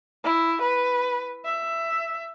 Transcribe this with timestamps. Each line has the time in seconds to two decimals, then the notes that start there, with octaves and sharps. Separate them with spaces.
0.24 E4
0.62 B4
1.46 E5